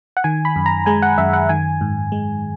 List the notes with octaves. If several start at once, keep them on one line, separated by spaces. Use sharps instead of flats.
F#5
D#3 G#5
B5
F#2
A#5
G#3 G#5
F#5
F#2 E5
F#5
D#3 G#5
G#2
G#3